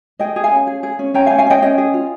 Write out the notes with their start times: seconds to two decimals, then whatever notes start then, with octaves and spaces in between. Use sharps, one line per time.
0.19 G#4 D#5 G5
0.36 G#4
0.44 F5 G#5
0.51 C#4
0.67 G#4
0.83 G#4
0.99 C#4
1.14 C#4 G5 A#5
1.26 F5 G#5
1.31 C#4
1.38 F5 G#5
1.46 C#4 D#5 G5
1.62 C#4 D#5 G5
1.78 G#4
1.94 F4